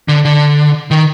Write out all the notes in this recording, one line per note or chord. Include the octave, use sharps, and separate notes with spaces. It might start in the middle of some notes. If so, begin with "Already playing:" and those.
D3
D3
D#3